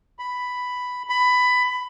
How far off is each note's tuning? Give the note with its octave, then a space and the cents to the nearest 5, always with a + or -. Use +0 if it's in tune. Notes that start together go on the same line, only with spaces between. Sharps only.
B5 +5
B5 +15